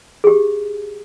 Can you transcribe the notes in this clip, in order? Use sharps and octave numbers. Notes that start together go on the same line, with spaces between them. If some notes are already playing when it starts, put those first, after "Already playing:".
G4 G#4